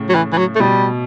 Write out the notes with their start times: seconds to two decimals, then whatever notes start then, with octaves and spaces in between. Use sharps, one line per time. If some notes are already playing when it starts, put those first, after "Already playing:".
Already playing: A2 C#3
0.09 F#3
0.15 E3
0.32 E3
0.38 F#3
0.56 A3
0.60 B2 G3